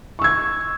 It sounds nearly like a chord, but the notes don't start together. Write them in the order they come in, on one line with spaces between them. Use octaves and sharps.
C#6 E6 G#6